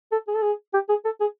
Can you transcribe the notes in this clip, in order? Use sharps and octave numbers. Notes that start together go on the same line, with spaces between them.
A4
G#4
A4
G#4
G4
G#4
A4
G#4